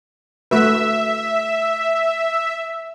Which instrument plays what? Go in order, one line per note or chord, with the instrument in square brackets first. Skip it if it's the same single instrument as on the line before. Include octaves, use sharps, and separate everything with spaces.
[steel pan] A3 F#4 B4 [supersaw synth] E5